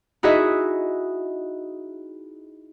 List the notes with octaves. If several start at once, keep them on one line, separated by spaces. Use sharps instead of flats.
D#4 E4 F#4 G#4 D#5 E5